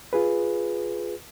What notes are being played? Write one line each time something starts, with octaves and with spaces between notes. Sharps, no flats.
F4 G#4 B4